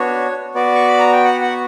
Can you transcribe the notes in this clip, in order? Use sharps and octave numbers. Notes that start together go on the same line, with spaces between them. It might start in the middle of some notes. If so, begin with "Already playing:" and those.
Already playing: B3 D4 F#4 C#5
B3 F#4 D5
C#6
B5
A#5
G5
F#5
F#5